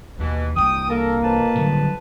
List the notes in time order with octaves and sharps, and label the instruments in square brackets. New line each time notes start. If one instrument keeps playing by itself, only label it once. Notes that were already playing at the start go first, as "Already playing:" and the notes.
[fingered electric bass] D#2 [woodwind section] B2 E3
[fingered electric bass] C2 E3 [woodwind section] G5 D#6
[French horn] A#3 [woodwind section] A4 A#4
[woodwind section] F2 B4 A5
[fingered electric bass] D3 F#3 G3